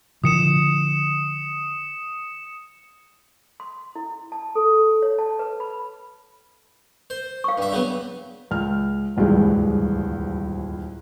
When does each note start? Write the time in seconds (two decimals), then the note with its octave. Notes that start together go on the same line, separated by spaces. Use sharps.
0.24 D3 F3 D#6 C#7 E7
3.60 C6
3.96 E4
4.32 A5
4.55 A4
5.02 C#5
5.19 A5
5.39 B4
5.60 B5
7.10 C5
7.44 F5 C#6
7.58 G2 E5
7.72 C#3 F#3 B3
8.51 C#2 F6
9.16 D#1 G#1 C#2 G2 E3 G#3